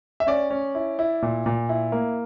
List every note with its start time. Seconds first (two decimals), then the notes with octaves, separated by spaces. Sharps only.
0.20 E5
0.27 C#4 D5
0.50 C#4
0.75 E4
0.99 E4
1.22 A#2
1.46 A#2
1.69 E4
1.92 A#3